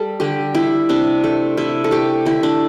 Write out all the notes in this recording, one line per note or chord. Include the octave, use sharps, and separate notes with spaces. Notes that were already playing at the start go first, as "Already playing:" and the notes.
Already playing: G3 A4
D3 G4
G3 E4
C3 D4
A3
C3 E4
A4
A3 G4
D3 E4
D4